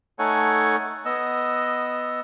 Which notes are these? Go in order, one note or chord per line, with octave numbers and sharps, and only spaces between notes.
A3 D#4 A4 C#5 F#5 G#5
B3 D#5 E6